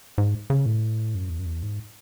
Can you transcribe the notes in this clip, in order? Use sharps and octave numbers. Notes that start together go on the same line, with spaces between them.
G#2
C#3
A2
F#2
E2
F#2
E2
G#2